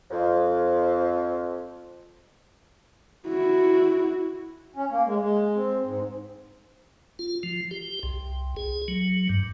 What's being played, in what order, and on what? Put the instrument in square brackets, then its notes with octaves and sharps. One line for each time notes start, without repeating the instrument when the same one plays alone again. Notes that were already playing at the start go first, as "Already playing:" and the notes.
[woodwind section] F2 F3
[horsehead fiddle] E4 F#4
[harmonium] C#4
A#3
G#3
G#3
C4
G#2
[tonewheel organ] F4
F3
G4
C2
G#4
F#3
G2